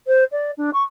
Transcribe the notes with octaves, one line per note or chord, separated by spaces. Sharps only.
C5
D5
D4
C#6